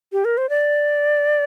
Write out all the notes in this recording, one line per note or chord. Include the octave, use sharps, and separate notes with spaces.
G4
A#4
C5
D5